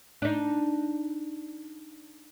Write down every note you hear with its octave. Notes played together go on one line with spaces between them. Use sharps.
D4 D#4